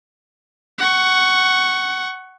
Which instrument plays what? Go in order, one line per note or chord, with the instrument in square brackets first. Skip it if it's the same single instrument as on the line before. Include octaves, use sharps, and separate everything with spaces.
[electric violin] F#5 C#6